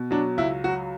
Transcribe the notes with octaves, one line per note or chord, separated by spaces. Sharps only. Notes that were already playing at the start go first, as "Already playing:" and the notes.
Already playing: B2
F#3 D4
C#2 E4
F#3 F#4